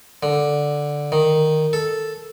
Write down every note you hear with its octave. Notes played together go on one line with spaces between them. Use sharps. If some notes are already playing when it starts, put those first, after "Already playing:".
D3
D#3
A4